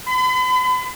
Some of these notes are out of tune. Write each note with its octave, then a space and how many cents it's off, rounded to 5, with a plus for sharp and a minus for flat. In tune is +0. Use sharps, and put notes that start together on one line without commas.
B5 +40